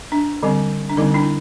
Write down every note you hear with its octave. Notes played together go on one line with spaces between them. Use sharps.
D4
D3 G3 C4
D4
D3 G3 C4 D#4
D4 E4